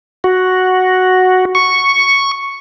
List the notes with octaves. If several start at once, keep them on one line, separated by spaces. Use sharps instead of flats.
F#4
C#6